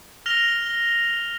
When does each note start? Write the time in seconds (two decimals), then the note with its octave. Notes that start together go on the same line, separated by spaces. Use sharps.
0.26 F6 A#6 F7 G7